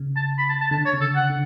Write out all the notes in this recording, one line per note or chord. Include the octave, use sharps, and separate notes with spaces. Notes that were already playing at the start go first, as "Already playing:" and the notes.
Already playing: C#3
A5
B5
A5
A5
D3 A5
C#5
C#3
A4
F#5
D3